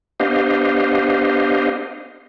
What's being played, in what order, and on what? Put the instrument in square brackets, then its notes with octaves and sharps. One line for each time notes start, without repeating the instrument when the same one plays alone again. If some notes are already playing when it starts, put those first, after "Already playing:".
[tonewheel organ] B3 D4 G4 C5 D#5 F5